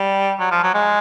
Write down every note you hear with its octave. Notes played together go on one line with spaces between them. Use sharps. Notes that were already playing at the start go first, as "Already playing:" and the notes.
Already playing: G3
F#3
F3
F#3
G#3